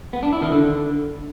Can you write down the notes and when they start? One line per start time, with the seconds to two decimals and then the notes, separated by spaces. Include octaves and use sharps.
0.13 B3
0.23 D4
0.32 E4
0.42 D#3
0.52 D3